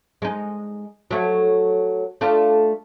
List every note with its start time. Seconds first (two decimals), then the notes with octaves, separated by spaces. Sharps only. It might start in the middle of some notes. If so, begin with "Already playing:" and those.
0.22 G#3 D#4
1.11 F#3 A3
2.21 A3 D4 F4